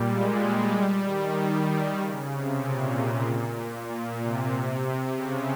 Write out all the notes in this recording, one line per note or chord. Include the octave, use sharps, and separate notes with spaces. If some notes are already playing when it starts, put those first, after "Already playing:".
Already playing: A#2 G3
G#3
G3
D#3
D#3
C#3
C3
A#2
A#2
C3
C3
C#3